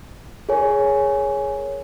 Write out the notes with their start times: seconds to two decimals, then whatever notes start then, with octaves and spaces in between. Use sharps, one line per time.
0.49 G#4 A#4 C#5 G#5